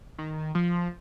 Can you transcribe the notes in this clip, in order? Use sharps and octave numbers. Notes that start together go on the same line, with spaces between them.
D#3
F3